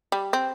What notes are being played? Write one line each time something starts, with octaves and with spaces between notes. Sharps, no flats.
G3
C4